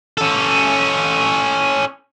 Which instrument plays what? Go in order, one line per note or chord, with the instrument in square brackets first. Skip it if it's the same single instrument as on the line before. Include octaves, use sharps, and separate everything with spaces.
[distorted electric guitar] C#4 A4